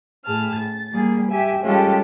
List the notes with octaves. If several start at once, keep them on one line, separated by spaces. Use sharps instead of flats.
A2 G#4 A5 F6
A6
G3 A#3 G#4
G4 E5 G#5
G3 G#3 C#4 F4 G4 A4